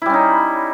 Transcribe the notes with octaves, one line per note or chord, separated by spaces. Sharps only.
G3 C#4 D#4 E4